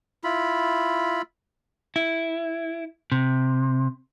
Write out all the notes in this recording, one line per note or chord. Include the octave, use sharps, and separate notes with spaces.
E4 F4 B5
E4
C3